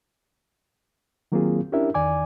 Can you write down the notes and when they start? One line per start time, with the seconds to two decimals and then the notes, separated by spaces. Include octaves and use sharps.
1.32 D#3 F#3 A#3 C4 F4 G#4
1.72 C#4 D4 E4 G4 A#4 E5
1.94 E2 D#3 D5 G#5 D6